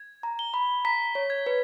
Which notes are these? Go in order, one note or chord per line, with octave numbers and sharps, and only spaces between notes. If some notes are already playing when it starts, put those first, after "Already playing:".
Already playing: G#6
A#5
G7
B5
A#5 B6
C#5
G#6
B4